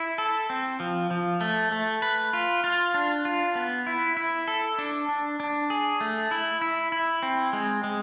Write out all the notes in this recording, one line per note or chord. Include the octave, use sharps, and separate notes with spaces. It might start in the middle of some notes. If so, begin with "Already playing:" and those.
Already playing: E4
A4
C4
F3
F3
A3
A3
B4
F4
F4
D4
F4
B3
E4
E4
A4
D4
D4
D4
G#4
A3
E4
E4
E4
C4
G#3
G#3